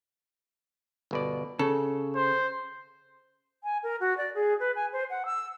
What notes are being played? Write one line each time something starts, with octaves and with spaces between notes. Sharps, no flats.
G1 B2 D5
C#3 A4
C5
G#5
A#4
F#4
D5
G#4
B4
G#5
C5
F#5
E6